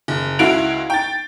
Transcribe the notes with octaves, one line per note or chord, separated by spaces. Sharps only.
F#1
C#2 E4 F#4 F5 D7 F7
G5 A6